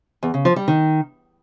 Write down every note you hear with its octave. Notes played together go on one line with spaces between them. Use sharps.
E2
C#3
F3
G3
D#3